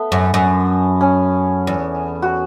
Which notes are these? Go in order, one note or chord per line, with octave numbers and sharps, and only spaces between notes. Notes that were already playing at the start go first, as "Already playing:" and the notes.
Already playing: A3 B3
F#2
F#2
C#4
E2
F#4